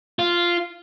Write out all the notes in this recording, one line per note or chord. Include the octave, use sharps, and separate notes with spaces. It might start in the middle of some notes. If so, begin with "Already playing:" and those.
F4